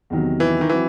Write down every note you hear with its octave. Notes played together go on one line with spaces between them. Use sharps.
E2 C3 D#3 F#3
E3
D#3
E3 F#3 C4 F#4